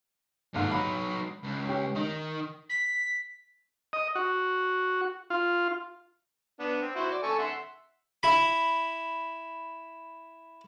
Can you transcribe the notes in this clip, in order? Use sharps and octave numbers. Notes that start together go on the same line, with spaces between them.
D#2 G#2 D3 F4
F#3 D#4 B5
C#2
C#4 G4
D#3 D#4
B6
D#5
F#4
F4
B3 D4
C4
E4 F#4 C5
D5
A4 G#5 C#6
E5 F#5 C6
E4 B5